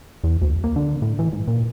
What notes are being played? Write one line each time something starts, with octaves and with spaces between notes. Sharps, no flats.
E2
D2
A#3
D3
A2
E3
G#2
A#2